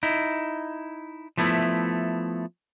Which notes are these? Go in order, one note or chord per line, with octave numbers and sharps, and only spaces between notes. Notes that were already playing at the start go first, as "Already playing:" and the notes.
D#4 E4
F3 A3 B3 E4